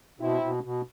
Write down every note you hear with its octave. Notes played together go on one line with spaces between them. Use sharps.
B2 C4 E4
B2
B2